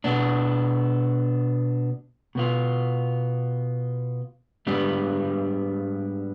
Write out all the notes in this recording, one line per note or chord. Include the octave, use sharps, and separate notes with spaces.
B2 B3 D4
B2 B3 F4
G#2 G3 B3 D4